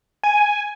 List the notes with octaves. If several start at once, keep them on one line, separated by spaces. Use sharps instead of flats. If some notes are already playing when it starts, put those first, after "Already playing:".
G#5